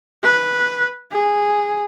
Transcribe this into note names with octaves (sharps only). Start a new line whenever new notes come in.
B4
G#4